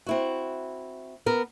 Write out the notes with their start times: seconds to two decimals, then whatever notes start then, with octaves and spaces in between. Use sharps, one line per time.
0.06 C4 E4 F#4
1.26 B3 A#4